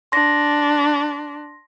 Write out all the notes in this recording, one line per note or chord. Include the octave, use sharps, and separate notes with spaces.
D4 C6 A#6